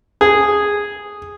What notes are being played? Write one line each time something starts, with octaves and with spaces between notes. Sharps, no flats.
G#4